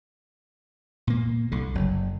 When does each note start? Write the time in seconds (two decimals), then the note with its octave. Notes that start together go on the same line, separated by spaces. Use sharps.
1.07 A#2 A#3
1.52 C2 D3
1.75 F#1 F#2